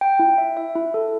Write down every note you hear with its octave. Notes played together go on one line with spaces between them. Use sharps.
G5
E4
E5
E5
E4
A4